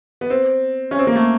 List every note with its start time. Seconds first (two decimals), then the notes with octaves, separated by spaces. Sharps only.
0.21 B3
0.30 C4
0.91 C#4
0.99 C4
1.07 A#3
1.16 A3